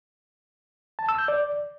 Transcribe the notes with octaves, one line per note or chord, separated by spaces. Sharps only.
A5
E6
G6
D5